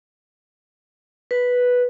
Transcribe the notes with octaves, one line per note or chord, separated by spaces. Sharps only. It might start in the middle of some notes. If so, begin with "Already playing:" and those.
B4